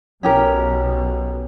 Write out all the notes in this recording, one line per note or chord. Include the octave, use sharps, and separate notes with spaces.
B1 B2 C#4 G4 A#4